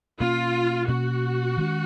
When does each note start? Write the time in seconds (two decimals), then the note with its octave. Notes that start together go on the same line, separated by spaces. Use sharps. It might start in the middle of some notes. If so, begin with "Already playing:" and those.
0.20 B2 A#3 C#4 F4
0.88 B2 A#3 C#4 F#4
1.57 D#3 G#3 C#4